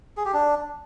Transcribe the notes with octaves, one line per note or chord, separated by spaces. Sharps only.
G#4
G4
D4